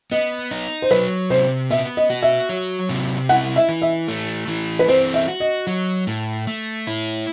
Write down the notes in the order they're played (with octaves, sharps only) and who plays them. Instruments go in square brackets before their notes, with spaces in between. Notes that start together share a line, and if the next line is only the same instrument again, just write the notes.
[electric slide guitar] B3 [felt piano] D#5
[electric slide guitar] D#4
[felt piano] C5
[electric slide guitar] F#3 [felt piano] B4
[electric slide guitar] C3 [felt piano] C5
[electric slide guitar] B3 [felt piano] E5
[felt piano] D#5
[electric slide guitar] F#4
[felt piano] E5
[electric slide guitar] F#3
C3
[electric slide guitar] E4 [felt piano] F#5
[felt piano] E5
[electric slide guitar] E3
[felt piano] E5
[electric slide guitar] A3
E3
[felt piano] B4
[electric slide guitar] C4 [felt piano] C5
[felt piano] E5
[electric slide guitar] F#4
[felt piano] D#5
[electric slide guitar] F#3
A2
A3
E4